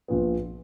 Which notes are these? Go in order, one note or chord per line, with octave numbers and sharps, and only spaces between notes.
A#1 A#2 F3 B3